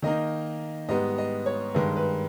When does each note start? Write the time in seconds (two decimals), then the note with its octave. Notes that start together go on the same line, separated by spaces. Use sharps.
0.02 D#3 A#3 D#4 D#5
0.88 G#2 G3 B3 D#5
1.18 D#5
1.46 C#5
1.75 G2 D#3 G#3 B4
1.96 B4